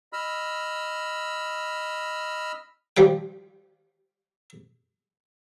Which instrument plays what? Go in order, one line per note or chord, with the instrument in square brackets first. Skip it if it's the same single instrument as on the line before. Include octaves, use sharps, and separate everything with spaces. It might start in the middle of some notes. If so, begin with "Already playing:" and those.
[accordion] D#5 B5 E6 F6
[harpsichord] F3 G3 G5